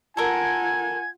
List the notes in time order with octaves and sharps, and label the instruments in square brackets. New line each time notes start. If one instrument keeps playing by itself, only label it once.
[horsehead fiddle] F4 F#5 [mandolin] A4 A#4 [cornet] G#5 [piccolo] G#6